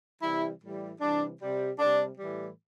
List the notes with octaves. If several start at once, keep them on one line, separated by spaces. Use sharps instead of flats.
C3 E3 G3 E4
A2 E3 G3
C3 E3 G3 D4
C3 G3
C3 G3 D4
A2 E3 G3